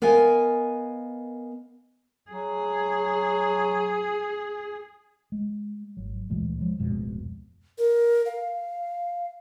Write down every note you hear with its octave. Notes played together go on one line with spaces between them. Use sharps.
B3 A#4 D#5 F5 G#5
F#3 G#4
G#3
G#1 F#3
D2 A#2 E3 G#3
F3 G#3
D1 F2 B2 G#3
A#4
F5